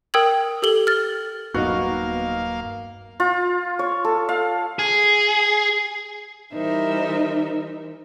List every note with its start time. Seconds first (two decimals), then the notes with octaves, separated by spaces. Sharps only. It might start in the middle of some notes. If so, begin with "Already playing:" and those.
0.14 A#4 G5 D#6 E6 G#6 F#7
0.62 G4 A4 F#7 G7
0.87 F6 A6
1.54 D#1 G2 F#3 A#3 B3 D#4 F#4 F5
3.20 F4
3.79 C#5
4.05 A4
4.29 F5
4.79 G#4
6.53 E3 G3 D#4 A#4 C5 E5